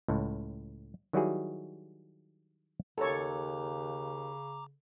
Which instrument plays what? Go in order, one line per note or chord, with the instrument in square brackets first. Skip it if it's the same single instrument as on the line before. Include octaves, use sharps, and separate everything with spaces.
[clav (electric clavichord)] C#2 A2
D#3 F#3 G3 E4 F#4 G#4
[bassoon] D#2 [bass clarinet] C#3 [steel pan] A4 C#5 [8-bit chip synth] A#5 D6